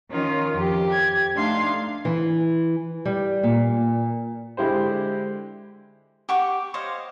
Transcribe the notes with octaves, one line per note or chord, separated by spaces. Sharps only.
D#3 C#4 D#4 F4
F2 G4
G#6
A3 D4 D#4 F5 C6
E3
G3
A#2
D3 G#3 E4 G4 C5
G4 F#5 C#6 D6
C5 C#5 D#5 F5